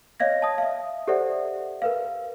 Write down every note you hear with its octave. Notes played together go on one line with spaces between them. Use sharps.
C#5 D#5 F5 G#6 A#6
A5 D#6
E5 F5
G4 A4 C5 D5 E5 F#5
A#4 B4 F5